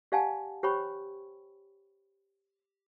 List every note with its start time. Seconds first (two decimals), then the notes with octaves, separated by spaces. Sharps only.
0.12 G4 D5 F5 F#5 G#5 A5
0.63 G4 C5 C#5 G5 B5 C#6